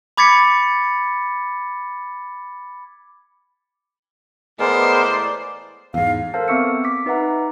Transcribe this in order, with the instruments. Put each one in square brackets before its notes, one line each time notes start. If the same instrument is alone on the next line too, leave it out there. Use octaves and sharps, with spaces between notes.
[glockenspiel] B5 D6 G#6 A6 B6 C#7
[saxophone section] A2 E3 D5 [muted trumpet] G#3 [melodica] B3 A#4 [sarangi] C5
[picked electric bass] E2 G#2 [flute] F5
[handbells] A4 A#4 C5 F5 A5
B3 C4 E5 C#6 E6 C#7
D6 B6
D#4 B4 E5 F#5 A#5